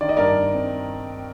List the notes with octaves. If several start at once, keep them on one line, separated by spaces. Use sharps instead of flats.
D#3 D5
D#5
G2 A#4 D5
G2
C4